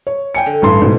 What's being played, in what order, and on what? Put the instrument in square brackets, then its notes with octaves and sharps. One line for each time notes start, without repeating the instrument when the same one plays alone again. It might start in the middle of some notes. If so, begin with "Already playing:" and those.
[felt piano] C#5
G5 G#5 C#7
[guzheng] D3
[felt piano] A1 G2 C6
A1 G#2 B2